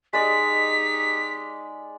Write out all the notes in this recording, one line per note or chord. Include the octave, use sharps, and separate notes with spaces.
G#3 D#4 G4 D5 D#5 B6